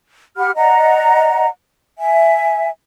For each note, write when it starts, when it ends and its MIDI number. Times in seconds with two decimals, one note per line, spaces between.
0.35 0.50 67
0.35 0.50 78
0.35 0.50 83
0.35 0.50 89
0.55 1.46 74
0.55 1.46 75
0.55 1.46 78
0.55 1.46 82
1.97 2.67 76
1.97 2.67 80